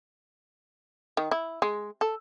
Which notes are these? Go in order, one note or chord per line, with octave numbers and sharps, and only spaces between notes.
D#3
E4
G#3
A4